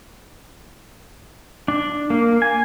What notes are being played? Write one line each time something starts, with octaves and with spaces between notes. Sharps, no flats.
D4
A#3
G#5